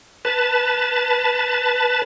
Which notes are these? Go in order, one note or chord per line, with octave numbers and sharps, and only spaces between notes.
B4 A5